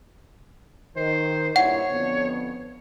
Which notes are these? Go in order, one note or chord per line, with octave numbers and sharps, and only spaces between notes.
D#3 C5
G2 A#2 E4 C#5 F#5
F2 D3 B3